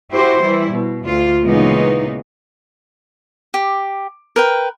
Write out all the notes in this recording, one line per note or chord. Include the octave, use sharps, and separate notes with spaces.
E4 F#4 G4 C5
E3 G3 E4
B2
D2 F4
A#2 C#3 E3 G#3 B3 D#4
G4
A#4 B4 G5